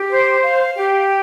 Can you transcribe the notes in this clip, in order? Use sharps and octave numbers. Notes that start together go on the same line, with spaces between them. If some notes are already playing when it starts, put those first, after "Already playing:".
Already playing: G4
C5
F5
G4